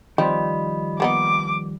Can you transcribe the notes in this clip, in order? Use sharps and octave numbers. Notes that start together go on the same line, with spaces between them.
D#3 F3 G3 C4 D#5 B5
A#3 B3 D#4 D6